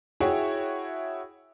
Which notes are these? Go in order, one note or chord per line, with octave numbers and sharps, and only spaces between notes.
E4 F#4 G#4 C#5 E5 G5